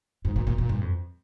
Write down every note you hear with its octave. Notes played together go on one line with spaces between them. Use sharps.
G#2
A#2
A#2
A#2
G2
F2